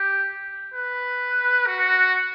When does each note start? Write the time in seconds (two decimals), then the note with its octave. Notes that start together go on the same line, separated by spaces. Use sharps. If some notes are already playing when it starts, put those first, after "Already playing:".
Already playing: G4
0.74 B4
1.67 F#4